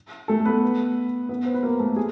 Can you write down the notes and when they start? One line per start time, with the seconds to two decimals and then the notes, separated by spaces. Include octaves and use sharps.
0.28 A3 A4
0.45 B3 B4
1.29 B3 B4
1.45 C5
1.54 B4
1.63 A#3 A#4
1.80 A3 A4
1.96 G#4